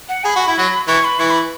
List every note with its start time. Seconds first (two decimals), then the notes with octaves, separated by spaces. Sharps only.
0.09 F#5
0.25 G#4 B5
0.36 F#4
0.47 E4
0.58 F#3 F#4
0.88 E3 E4 C#6
1.04 B5
1.19 E3 E4 C#6
1.31 B5